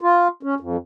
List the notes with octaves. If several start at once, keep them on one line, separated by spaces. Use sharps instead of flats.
F4
C#4
F2